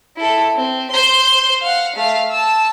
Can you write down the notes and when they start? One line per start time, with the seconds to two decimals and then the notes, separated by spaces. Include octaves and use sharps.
0.17 E4 A4
0.55 C4
0.91 C5 C6
1.61 F5 F#5
1.96 A3 F5
2.30 A5 E6